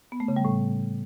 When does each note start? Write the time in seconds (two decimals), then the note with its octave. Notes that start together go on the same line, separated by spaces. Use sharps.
0.12 B3
0.20 A3
0.28 C#3
0.36 G3
0.45 A2